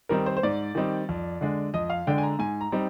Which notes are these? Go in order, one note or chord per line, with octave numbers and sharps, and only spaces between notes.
D#3 G3 C4 D#4 A#4
C5
C5
G#2 D5
D#3 G3 C4 D#4
F2
D3 G#3 D4
F2 D#5
F5
D3 G#3 D4 G5
G#5
A#5
G#2 G#5
A#5
G3 C4 D#4